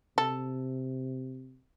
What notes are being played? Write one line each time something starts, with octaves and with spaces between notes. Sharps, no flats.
C3 A4